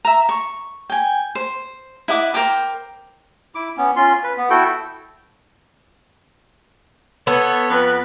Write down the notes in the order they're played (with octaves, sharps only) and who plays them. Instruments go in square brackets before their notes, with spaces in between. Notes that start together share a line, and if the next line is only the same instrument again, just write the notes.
[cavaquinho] E5 A#5
C#6
G5 G#5
C5
E4 D#5 F#5 D6
A#4 C5 G5 D6
[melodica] E4 D6
B3 C#4
C#4 F4 C6
B4
B3
E4 F#4 A4 G5
[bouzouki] B3 [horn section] A4 C#5
[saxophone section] F2 B4